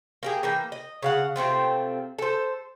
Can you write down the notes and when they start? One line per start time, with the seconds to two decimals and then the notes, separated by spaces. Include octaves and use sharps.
0.23 A#3 G4 G#4
0.43 E3 A#3 G5
0.72 D#5
1.03 C#3 F5 F#5
1.36 C3 A3 C4 F4
2.19 A4 C5